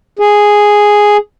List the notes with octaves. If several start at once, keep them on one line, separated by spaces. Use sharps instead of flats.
G#4